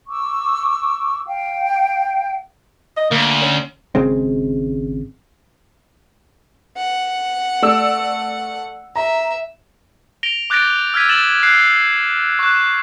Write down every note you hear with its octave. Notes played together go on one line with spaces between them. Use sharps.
C#6 D6 E6
F5 G5
D#5
D2 A#3
C#4
G#1 C#3 G#3 C4
F#5
A3 D5 E6
E5 A#5
A#6 D7 F7 G7
D6 F#6 G6 A6 A#6 D7
E6 F6 G#6 B6 D#7
A6 E7 F#7
F#6 C7
C#6 F#6